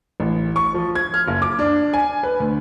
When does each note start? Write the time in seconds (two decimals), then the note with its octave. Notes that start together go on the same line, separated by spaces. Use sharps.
0.20 A1
0.56 C#6
0.74 F3
0.95 G#6
1.14 F6
1.28 F#1
1.42 D6
1.59 D4
1.93 G#5
2.23 B4
2.40 D2